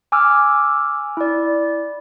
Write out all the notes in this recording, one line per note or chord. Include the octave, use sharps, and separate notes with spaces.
G#5 D6 E6 F6
E4 D5